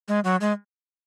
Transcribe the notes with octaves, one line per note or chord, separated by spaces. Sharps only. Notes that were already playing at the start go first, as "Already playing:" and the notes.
G#3
F#3
G#3